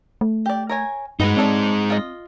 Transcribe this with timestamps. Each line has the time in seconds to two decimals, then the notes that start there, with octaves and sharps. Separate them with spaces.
0.21 A3
0.46 G4 D5
0.69 A#4 C#5 G#5
1.20 G2 G#3 B3 D#4 F#4 B4
1.37 C4 D4 A4 C#5
1.90 F4 D#5